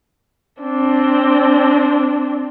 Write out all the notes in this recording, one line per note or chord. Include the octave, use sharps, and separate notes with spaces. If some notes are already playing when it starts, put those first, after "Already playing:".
C4 D4